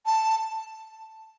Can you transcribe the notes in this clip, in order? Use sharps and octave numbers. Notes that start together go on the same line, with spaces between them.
A5